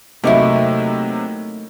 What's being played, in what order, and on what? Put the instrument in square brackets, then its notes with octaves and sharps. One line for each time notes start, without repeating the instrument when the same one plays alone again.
[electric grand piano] C3 F#3 [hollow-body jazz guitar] A3 A#3 D#4 [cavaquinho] E4 C#6 D6